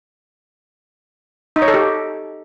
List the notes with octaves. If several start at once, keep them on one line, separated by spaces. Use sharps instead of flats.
D#4
C#5
A4
G4